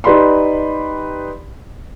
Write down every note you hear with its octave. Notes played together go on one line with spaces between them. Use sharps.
D#4 G4 B4 D5 B5 C6